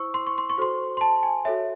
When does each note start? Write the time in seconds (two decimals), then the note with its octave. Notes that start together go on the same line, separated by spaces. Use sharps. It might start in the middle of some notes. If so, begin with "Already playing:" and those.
Already playing: E4 C5 C#6 E6
0.14 C6
0.27 C#6
0.38 C6
0.50 C#6
0.57 F#4 A4 C5 C6
0.97 C6
1.01 A5
1.23 G#5
1.45 F#4 A4 C#5 E5